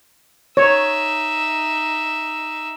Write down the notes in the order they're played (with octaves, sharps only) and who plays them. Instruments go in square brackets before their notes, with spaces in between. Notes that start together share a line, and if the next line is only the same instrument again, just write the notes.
[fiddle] D#4 E5 [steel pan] C#5